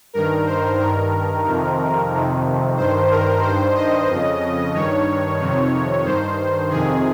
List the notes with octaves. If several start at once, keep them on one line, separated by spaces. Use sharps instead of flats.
G2 D#3 A#4
C5
G2 D#3 A#4
F2 C3 D#3
F2 C3 D#3
G2 D#3 C5
A#4
G2 D#3 C5
D#5
F2 C#3
G2 D#3 C#5
F2 C3 D#3
G2 D#3 C5
F2 C3 D#3 G#4